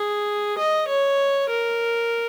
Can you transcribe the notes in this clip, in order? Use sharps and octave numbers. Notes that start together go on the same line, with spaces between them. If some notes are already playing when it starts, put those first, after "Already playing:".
Already playing: G#4
D#5
C#5
A#4